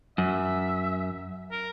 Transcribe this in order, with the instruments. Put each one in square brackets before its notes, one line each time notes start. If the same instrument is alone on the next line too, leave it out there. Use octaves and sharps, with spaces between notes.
[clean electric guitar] F#2 [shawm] E5
[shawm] A#4